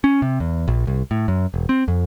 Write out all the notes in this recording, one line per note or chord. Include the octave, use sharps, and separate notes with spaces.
C#4
C3
E2
A#1
C2
A2
F#2
E1
C4
F2